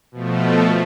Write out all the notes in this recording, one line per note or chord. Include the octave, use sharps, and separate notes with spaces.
B2 F3 A3